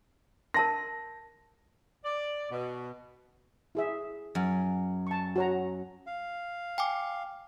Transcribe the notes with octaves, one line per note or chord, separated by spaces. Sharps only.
A#4 A5 C6 A#6
D5
B2
E4 G#4 E5
F#2
A5 C#6
F#4 C#5 A#5
F5
G5 G#5 D6